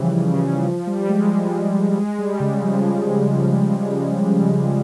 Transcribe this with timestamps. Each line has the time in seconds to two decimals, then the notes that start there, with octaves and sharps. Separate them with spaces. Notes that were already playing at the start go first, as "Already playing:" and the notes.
Already playing: C#3 E3 F3 G3
0.17 C#3
0.33 C#3
0.49 C#3
0.66 F3
0.87 G3
1.09 G#3
1.97 G#3
2.19 G3
2.40 C#3
2.62 F3